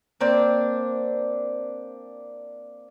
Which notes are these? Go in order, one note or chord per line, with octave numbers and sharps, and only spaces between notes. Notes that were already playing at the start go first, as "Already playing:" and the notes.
A#3 C4 D4